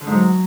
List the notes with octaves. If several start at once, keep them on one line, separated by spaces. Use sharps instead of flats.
D3
G#2
F#3